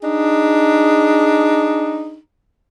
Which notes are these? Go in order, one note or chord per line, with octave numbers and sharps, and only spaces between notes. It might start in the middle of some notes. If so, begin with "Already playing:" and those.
D4 D#4 G#4